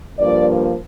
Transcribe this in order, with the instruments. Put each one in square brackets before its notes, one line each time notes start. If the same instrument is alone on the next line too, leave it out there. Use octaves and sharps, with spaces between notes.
[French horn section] G2 F3 A#3 D5